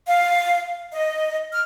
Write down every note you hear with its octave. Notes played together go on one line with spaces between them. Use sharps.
F5
D#5
F6